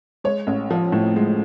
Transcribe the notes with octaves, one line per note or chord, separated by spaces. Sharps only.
G#3 C#5
A1
F3
A2
G#3